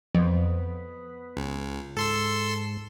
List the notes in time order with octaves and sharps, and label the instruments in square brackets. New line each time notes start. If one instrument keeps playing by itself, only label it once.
[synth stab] F2 [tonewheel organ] B3
[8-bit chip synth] C#2
[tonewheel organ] G#2 [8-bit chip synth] A4 C6 E6